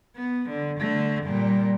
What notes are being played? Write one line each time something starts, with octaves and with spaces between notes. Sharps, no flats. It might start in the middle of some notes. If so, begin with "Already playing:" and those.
B3
D3
D3 A3
A#2 G3